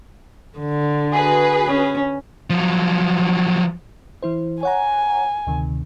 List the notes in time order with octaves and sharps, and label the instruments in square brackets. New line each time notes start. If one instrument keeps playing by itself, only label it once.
[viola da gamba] D3
[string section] F#4 G#4 B4
[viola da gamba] C#4
[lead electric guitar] F3 F#3
[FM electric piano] E3 E4 C5
[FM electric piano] C#5 F#5 A#5 [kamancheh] G#5
[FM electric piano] D2 C3 D#3